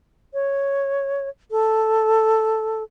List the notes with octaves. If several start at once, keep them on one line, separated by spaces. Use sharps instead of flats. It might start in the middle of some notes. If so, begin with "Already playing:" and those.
C#5
A4